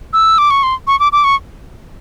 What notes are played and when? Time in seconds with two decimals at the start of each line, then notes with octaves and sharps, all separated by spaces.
0.13 E6
0.38 D6
0.50 C#6
0.63 C6
0.87 C#6
1.00 D6
1.12 D6
1.24 C#6